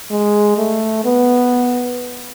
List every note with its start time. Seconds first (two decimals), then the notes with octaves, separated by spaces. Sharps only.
0.11 G#3
0.58 A3
1.05 B3